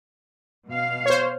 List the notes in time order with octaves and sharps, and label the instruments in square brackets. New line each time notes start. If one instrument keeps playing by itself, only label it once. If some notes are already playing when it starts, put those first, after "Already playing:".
[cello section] B2 F5
[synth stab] C5 C#5